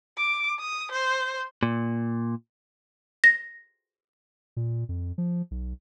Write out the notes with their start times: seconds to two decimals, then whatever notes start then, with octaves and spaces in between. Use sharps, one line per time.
0.18 D6
0.60 D#6
0.91 C5
1.63 A#2
3.24 A#6
4.57 A#2
4.89 F2
5.18 F3
5.51 B1